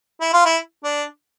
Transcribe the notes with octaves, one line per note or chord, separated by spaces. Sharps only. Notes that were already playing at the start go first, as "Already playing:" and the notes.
E4
F4
E4
D4